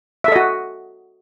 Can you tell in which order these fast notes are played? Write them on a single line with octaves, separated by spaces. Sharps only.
E5 A4 D#5 F#4